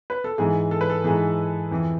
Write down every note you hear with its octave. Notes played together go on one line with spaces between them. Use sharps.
B4
A4
G#2 E3 G#4
A4
B4
A4
G#2 E3 G#4
F2 E3